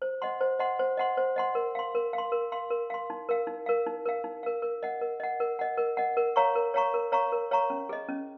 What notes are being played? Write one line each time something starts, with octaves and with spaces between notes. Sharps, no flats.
C5
D#5 F#5 C6
C5
D#5 F#5 C6
C5
D#5 F#5 C6
C5
D#5 F#5 C6
A#4
F5 C6
A#4
F5
C6
A#4
F5 C6
A#4
F5 C6
D#4
A#4 F5
D#4
A#4 F5
D#4
A#4 F5
D#4
A#4 F5
A#4
D#5 F#5
A#4
D#5 F#5
A#4
D#5 F#5
A#4
D#5 F#5
A#4
C#5 F5 A#5 C#6
A#4
C#5 F5 A#5 C#6
A#4
C#5 F5 A#5 C#6
A#4
C#5 F5 A#5 C#6
C#4
G#4 D#5
C#4